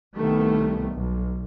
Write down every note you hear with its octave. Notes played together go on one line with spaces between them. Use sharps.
C2 D#3 G3 A3 B3
B1